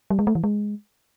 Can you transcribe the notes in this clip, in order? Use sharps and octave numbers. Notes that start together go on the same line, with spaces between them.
G3
G#3
A3
E3
G#3